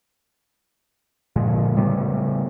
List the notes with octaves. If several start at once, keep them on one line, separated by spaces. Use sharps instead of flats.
A#2 D3 F3 G#3
A2 C#3 G3 B3